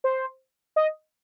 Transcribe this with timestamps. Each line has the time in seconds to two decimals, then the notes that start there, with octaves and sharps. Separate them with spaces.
0.04 C5
0.76 D#5